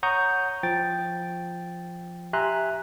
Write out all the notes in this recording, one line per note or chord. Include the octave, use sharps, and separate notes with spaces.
C#5 F#5 A#5 C#6 D#6 G6
F3 G5 A6
G4 E5 G#5 A#5 C6 F#6